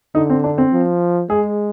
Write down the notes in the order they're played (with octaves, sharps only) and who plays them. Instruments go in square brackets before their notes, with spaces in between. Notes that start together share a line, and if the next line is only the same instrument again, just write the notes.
[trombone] D3 [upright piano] D#4
[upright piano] C4
D4
C4
[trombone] F3
[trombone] G#3 [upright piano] G#4